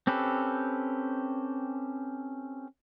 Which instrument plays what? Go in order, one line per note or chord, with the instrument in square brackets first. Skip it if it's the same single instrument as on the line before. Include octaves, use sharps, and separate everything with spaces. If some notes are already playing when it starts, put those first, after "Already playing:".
[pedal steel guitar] C4 C#4 G4 A4 B4